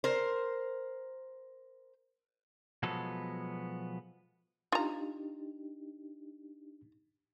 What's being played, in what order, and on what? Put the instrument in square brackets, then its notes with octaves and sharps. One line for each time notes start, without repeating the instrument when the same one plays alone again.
[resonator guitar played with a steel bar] A#4 C5
[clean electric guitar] B2 F3 F#3 G#3 B3 A4
[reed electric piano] D4 D#4 G4 [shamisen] F4 A#5